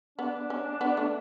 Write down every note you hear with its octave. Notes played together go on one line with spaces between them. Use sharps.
B3 D4
C#4
B3
A3